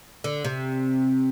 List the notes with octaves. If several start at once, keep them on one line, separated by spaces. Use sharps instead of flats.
D3
C3